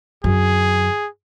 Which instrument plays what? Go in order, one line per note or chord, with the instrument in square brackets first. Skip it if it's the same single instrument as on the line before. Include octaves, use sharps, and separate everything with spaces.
[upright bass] F#2 D3 [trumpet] G#4